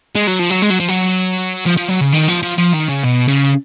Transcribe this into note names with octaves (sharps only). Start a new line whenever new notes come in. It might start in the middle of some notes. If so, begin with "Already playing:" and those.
G#3
F#3
F3
F#3
G#3
F#3
F3
F#3
F3
F3
F#3
C#3
D#3
F3
F3
F3
D#3
C#3
B2
C#3